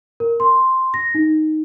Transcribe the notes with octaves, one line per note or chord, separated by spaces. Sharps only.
A#4
C6
A#6
D#4